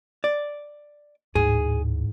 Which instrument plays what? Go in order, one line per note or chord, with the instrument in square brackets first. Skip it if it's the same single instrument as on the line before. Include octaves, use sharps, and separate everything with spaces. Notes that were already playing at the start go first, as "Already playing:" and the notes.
[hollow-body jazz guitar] D5
[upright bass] A1 G#2 [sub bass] D2 [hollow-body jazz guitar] G#4